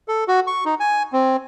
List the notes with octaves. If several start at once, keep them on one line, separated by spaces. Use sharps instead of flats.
A4
F#4
C#6
D#4
G#5
C4